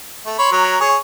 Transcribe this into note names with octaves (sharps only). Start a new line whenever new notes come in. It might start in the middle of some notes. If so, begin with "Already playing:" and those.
A3
C#5 B5 C6
F#3 A#4
G#4 C#5